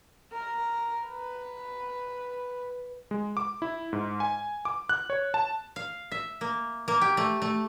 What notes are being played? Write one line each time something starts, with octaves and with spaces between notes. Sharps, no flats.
A#4
B4
G#3
D6
E4
G#2
G#5
D6
F#6
C#5
A5
F5
E5
A#3
A#3
G4
A3
A3